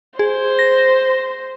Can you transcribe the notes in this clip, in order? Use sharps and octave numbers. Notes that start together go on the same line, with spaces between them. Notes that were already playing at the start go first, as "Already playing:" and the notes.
G#4 C5
A#6